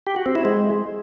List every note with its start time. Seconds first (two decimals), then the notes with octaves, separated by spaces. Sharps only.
0.07 G4
0.16 F#4
0.26 C4
0.35 E4
0.45 G#3